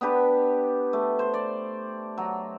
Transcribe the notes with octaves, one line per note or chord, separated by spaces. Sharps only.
B3 D4 G4 B4
A3
C5
D5
F#3